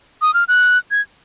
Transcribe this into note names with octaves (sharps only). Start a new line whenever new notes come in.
D#6
F6
F#6
G#6